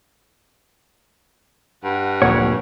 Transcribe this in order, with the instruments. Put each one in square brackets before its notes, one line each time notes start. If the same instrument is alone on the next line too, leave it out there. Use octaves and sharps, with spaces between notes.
[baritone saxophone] G2 [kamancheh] F#5
[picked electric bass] D1 F2 A#2 [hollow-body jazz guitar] C#5